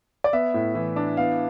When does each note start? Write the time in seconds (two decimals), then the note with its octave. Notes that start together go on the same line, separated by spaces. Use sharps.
0.24 D5
0.33 B3 E5
0.54 A2
0.75 E3
0.96 D4
1.17 B3 F5